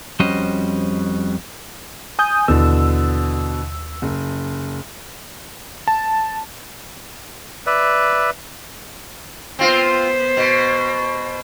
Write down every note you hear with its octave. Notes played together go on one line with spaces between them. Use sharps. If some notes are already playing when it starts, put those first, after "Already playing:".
F2 G3 C#4 F#4 C5 D#5
G#5 D#6 G6
D#2 B2 D3 E3 E6
F#1
A5
B4 D5 E5
B3 C4 F4 C5
B2